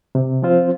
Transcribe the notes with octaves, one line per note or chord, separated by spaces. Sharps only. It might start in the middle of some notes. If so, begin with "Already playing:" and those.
C3
F3 C4 F4 C5